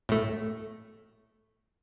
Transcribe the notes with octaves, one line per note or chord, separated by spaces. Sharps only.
A2 A3